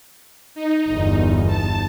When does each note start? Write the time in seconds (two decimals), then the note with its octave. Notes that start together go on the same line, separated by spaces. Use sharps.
0.55 D#4
0.90 G1 E2
1.47 A5